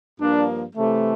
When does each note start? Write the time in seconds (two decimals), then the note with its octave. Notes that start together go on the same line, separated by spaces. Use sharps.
0.18 G2 F3 A#3 D4
0.75 C3 E3 A3